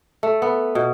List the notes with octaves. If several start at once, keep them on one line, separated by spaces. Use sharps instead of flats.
A3
B3
B2